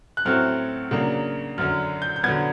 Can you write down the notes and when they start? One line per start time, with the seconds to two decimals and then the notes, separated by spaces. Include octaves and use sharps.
0.17 F#6
0.25 A2 F#3 A3 C4 F6
0.91 C#3 F#3 A#3 D4
1.58 F#2 D3 F#3 F6
2.02 G6
2.16 G6
2.23 D3 F#3 B3 G#6